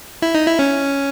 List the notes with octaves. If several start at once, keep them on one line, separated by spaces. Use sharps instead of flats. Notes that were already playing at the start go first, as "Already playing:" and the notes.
E4
D#4
E4
C#4